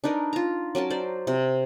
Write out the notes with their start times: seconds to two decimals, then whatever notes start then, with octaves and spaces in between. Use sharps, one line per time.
0.04 D4 D#4 A#4 B4
0.33 F4 A#5
0.75 F#3 C#4 A#4 A5
0.90 C5 D5
1.27 C3